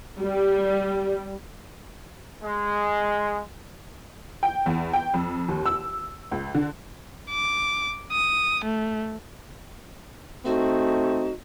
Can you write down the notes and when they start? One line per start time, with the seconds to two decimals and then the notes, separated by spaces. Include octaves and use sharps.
0.21 G3
2.43 G#3
4.43 G5
4.66 E2
4.93 G5
5.14 F2
5.48 D#2
5.66 E6
6.31 C#2
6.55 D3
7.30 D6
8.12 D#6
8.65 A3
10.45 A3 C4 D#4 F#4